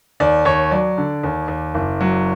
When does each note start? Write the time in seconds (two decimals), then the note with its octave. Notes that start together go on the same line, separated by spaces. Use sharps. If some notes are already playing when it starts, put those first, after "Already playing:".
0.20 D#2 D5
0.45 D#2 C#5
0.71 F#3 D5
0.98 D3
1.23 D#2
1.48 D#2
1.74 F#1
2.01 F#3